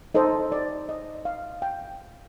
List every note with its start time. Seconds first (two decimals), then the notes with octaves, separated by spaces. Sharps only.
0.14 D#4 A4 C5 D#5
0.52 D5
0.89 D#5
1.25 F5
1.62 G5